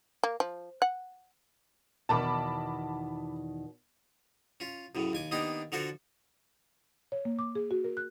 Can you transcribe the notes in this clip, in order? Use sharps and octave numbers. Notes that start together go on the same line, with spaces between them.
A#3
F3
F#5
E2 B2 D#3 A5 B5 D6
C#4 F4
F#2 A2 C#3
D#2 G#5 D6
D#3 A#3 B3 D4 D#4 G4
D3 F3 F#4 A4 A#4 C5
C#5
A#3
D6
G#4
F#4
A#4
F#6